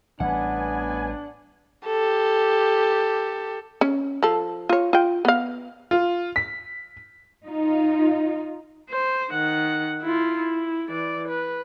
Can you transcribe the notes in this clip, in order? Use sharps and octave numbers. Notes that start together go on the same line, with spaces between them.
A1 E3 G3 B3 D4 F#5 G#5
G4 A4
C#4
F3 A4
F4 C#5
F4 G5
B3 F5
F4
B6
D#4 F4
C5
D#3 F#5
E4 F4
E4
E3 D5
B4